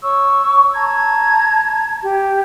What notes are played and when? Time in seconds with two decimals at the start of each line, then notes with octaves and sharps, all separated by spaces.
0.03 C#5 C#6 E6
0.73 A5 A#5 G#6
2.04 G4